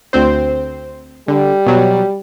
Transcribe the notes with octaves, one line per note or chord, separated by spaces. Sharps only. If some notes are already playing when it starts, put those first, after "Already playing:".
D2 C4 C5
D3 G3
B2 F#3